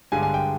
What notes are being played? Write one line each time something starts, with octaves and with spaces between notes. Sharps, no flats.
G2 D3 G#3 G#5
G#5
G5